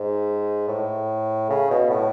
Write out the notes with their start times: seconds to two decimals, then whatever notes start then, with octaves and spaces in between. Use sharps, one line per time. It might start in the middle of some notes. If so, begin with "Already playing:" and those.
Already playing: G#2
0.68 A2
1.50 C#3
1.70 B2
1.90 A2